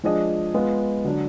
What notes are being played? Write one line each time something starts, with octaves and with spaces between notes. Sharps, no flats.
F3 G#3 D4 G#4 D#5
G#3 B3 F4
D3 F#3 D4